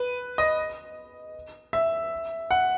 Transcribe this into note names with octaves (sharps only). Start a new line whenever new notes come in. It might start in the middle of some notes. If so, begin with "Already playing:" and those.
Already playing: B4
D#5
E5
F#5